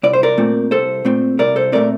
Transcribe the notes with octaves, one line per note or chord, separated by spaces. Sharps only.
C2 D5
C5
A#4 D5
A#2 A3 C4
C2 A4 C5
A#2 A3 C4
C2 A#4 D5
A4 C5
A#2 A3 C4 A#4 D5